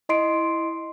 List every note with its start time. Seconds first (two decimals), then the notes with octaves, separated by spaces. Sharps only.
0.09 E4 D#5 C6 C7 D7